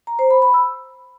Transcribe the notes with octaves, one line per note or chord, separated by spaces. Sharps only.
A#5
C5
B5
B5
E6